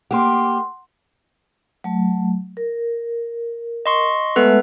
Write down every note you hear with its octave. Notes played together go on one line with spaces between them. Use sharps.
A#3 G4 F#5 C6
F#3 A3
A#4
D#5 C6 C#6
G#3 A3 B3 A4 B4 E5